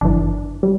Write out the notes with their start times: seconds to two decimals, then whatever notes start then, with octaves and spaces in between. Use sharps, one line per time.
0.01 G1 F#2 E3 D4
0.63 G3